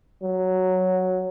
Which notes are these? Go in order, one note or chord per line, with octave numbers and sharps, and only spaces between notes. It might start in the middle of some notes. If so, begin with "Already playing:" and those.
F#3